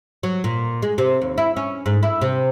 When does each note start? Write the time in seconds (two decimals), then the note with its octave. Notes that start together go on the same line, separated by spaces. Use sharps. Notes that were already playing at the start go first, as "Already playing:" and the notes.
0.23 F#3
0.44 A#2
0.82 G#3
0.98 C3
1.22 D#2
1.38 E4
1.57 C#4
1.86 G#2
2.03 E4
2.21 C3